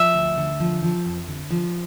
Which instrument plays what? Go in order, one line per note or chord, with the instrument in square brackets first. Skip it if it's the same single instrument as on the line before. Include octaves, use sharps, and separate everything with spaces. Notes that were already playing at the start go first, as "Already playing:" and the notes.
Already playing: [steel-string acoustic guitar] F3 [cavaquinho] E5
[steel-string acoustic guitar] D2
D3
F3
F3
F2
D3
F3